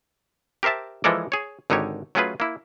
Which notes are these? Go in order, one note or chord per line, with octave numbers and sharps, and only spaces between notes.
G4 A#4 C5 E5 A5
E3 F3 G#3 A4 A#4 D5
G#4 C#5
G#1 D3 D#4 G4 C#5
F#3 A3 C#4 F4 G#4 B4
A#3 E4